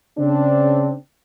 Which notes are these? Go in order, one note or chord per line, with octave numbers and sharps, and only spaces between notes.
C#3 C4 D4